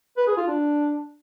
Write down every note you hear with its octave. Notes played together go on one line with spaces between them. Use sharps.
B4
G#4
F4
D4